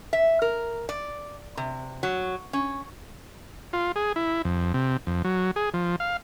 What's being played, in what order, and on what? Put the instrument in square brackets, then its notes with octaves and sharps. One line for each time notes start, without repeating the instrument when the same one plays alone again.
[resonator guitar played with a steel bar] E5
A#4
D5
C3
F#3
C#4
[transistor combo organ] F4
G#4
E4
F2
C3
F2
F#3
G#4
F3
F5